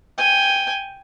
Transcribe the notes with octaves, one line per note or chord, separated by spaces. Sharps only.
G5 G#5